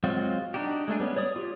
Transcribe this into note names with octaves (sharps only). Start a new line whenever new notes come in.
F#3 G#3 C4 F4 F#4
D4 D#4 F#4 G4
G#3 A3 D4 G#4
G3 B3 C#4
C#5 D5 D#6
F4 G4